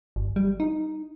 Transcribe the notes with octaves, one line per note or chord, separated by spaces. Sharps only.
G1
G3
D#4